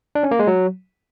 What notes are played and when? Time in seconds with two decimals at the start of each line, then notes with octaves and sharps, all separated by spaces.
0.15 D4
0.23 C#4
0.31 A#3
0.39 G#3
0.47 F#3